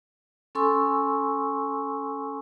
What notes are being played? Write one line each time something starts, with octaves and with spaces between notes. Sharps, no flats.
C#4 A4 G#5 C6 C#6 E6